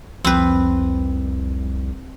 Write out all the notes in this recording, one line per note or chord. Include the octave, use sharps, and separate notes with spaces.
C2 F2 C4 B4